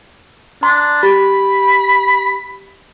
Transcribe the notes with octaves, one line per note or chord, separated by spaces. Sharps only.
D4 A#5 C6
G4 B5